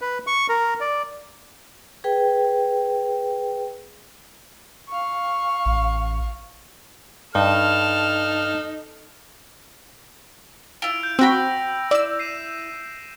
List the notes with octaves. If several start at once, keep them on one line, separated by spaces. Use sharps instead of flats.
B4
C#6
A#4
D5
G#4 B4 G5
F5 C#6
A1
G2 D#4 A4 A5 F6
E4 F4 D7 F7
G6
C4 F#4 G5 B5 E6 A#6
E4 D5 E6
C7 D#7 E7